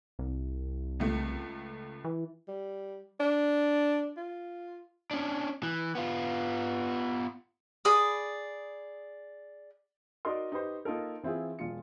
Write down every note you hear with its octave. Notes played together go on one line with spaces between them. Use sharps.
C2
C#2 A3
E3
G3
D4
F4
C#4 D4
E3
B3 F4
G#4 D5 B5 D#6
D#4 F#4 A#4 D5 D#5 C6
D#4 G4 B4 C5
A#3 D#4 F4 A4 A#4
E3 C4 E4 F4 G#4
E1 F4 C#7